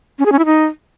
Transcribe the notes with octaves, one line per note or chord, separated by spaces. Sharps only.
C#4
G#4
C#4
E4
D#4